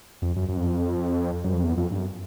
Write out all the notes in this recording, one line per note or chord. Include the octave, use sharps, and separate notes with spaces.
F2
F#2
F#2
F2
F#2
F2
E2
F2
G2
F#2